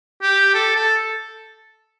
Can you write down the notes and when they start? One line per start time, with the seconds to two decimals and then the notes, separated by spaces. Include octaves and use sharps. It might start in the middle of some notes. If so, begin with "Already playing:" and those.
0.22 G4
0.54 A4
0.76 A4